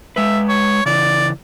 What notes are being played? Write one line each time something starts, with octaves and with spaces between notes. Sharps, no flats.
G#3 B4 E5
C#5
C#3 E3 D5